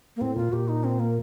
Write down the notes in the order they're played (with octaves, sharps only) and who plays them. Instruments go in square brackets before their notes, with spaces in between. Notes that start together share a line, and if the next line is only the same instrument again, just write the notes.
[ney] A#3
[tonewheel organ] A2 [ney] C4
[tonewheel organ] A#2 [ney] F4
[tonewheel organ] A#2 [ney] G4
[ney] D#4
C4
A#3